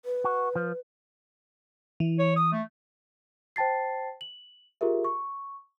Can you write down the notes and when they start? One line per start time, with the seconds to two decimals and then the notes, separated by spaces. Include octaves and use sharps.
0.05 B4
0.24 F#4
0.55 F3
2.00 E3
2.19 C#5
2.36 D#6
2.52 A3
3.56 C5 G5 A5 A6 C7
4.21 F#7
4.81 F4 G4 G#4 A#4 E5
5.05 C#6